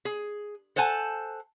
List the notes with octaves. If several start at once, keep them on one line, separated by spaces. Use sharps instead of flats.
G#4
A4 C5 F#5 G#5 A5